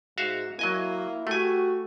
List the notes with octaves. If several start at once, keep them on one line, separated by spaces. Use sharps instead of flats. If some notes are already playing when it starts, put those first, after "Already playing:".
G#2 F#4 E5 F5
F#3 A#3 E4 D#5 G#5
A3 F#4 G4 G#5